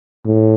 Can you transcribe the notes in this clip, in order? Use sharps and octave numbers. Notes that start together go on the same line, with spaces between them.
A2